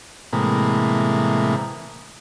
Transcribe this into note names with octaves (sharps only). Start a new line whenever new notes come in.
A2 C3 E3 G#3 A#3